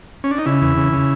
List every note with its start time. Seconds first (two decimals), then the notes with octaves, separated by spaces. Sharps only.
0.24 C#4
0.31 D4
0.38 D#4
0.46 C#3 E4
0.61 E2
0.77 C#3
0.92 C#3